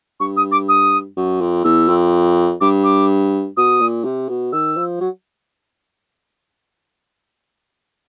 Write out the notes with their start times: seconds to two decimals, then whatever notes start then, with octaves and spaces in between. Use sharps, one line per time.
0.20 G2 C#6
0.37 D#6
0.52 D6
0.69 D#6
1.16 F#2
1.41 F2
1.64 E2 E6
1.88 F2
2.61 G2 D6
2.84 D6
3.57 B2 D#6
3.80 A#2
4.04 C3
4.29 B2
4.53 D#3 E6
4.77 F3
5.00 F#3